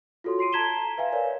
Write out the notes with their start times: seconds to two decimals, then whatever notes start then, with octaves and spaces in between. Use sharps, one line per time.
0.24 F4 F#4 A4 C#5 C6
0.39 C6 C7 D7 D#7
0.53 A5 A#5 G#6 B6 E7 G7
0.98 B4 E5 F5 G#5
1.12 A#4 C#5 D5 F5